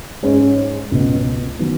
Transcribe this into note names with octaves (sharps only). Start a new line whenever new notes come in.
G#2 G#3 C#4
C#2 B2 B3
D#3 F#3 B3